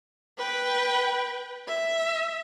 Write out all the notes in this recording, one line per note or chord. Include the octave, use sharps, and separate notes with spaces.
B4 G5
E5